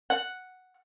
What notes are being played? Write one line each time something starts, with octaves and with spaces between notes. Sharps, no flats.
F#5